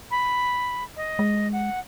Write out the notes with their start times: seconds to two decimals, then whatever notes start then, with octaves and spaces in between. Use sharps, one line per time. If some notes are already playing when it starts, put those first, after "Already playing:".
0.11 B5
0.96 D#5
1.19 G#3
1.52 F#5